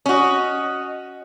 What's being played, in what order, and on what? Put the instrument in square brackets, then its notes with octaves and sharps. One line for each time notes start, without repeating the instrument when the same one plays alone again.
[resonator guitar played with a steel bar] C#4 F#4 [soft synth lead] D#5